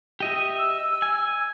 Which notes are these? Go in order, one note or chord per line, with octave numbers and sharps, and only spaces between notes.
G4 D#5 E5
E6
G#5